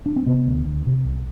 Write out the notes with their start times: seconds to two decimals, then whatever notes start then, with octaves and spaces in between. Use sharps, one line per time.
0.06 D4
0.16 C4
0.26 C3 B3
0.47 D2
0.66 D2
0.86 C3
1.05 C2